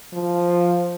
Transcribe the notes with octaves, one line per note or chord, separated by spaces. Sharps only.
F3